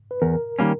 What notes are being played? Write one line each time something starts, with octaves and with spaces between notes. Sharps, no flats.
B4
E2 A#4
D#3 G3 A#3 C#4